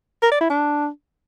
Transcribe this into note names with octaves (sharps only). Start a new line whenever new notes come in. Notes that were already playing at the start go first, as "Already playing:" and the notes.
A#4
D5
E4
D4